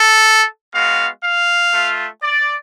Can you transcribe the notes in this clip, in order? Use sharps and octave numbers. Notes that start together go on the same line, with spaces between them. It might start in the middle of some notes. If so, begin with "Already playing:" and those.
Already playing: A4
G#3 B3 F#4 F5
F5
A3 F4
D5